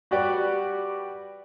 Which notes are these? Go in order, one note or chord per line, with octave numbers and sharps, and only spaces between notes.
G3 F#4 G4 B4 D5